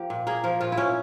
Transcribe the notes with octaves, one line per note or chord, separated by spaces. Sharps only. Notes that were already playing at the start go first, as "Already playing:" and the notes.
Already playing: F3 A#3 G4
A#2
A#3 G#4
F3 A#4
A#2 F4
E4
A#2 C#4